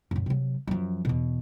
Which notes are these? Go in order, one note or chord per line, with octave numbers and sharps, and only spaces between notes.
F#2 A#2
C3 F#3
F#2 F3
E2 B2